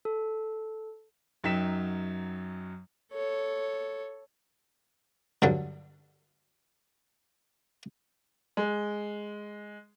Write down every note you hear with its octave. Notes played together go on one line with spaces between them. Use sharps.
A4
F#2 F#3 D#4 G5 B6 E7
A4 C#5
G2 D3 F#3
G#3